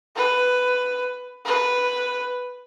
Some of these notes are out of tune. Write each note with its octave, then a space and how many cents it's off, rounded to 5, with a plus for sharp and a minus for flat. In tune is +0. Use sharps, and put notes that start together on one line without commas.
B4 +10
B4 +0